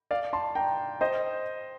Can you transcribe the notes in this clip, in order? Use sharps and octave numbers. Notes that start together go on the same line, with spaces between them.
D5 F5
A5 C6
G5 A#5
C5 D#5